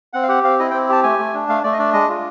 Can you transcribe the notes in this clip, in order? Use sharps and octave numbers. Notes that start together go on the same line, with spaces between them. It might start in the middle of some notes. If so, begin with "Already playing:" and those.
C4 F#5
F5
G4 F#5
C4 F5
E4 D#5
G5
C4
G4 A5
A3 G#5
A3
D4
A3 F5
A3 D5
D#5
D4 D5
G#3 D#5
F4